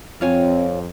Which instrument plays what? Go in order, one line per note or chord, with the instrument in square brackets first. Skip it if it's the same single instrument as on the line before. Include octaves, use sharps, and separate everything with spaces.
[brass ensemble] F2 [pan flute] C4 [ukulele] F4 C#5 G#5